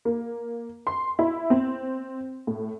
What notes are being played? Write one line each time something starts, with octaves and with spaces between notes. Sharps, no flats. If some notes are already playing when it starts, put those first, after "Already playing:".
A#3
C6
E4
C4
A2